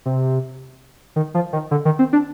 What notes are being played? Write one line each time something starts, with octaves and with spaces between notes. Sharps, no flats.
C3
D#3
F3
D#3
D3
D#3
C4
D4